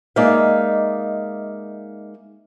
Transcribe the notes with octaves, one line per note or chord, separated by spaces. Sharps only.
G#3 A#3 D#4 D5 E5 F5